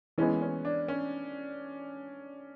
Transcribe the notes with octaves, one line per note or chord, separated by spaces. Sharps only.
E3 G#3 B3 C#4
C#4
D4
C#4